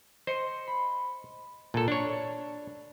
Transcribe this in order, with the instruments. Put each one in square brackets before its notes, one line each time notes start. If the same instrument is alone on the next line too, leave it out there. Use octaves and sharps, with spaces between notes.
[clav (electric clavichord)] C5 [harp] D#5 C6 C#7
[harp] B5
[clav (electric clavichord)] A#2 A4 [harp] A5
[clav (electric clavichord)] D4 C#5